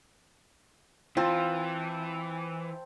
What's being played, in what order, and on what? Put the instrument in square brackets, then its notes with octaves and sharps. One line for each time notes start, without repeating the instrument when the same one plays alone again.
[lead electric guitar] E3 [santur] C4 A5 [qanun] F4